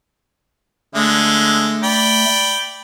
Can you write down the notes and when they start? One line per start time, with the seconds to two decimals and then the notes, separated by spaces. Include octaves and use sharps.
0.95 D3 G#3 A3
1.83 D5 G5 B5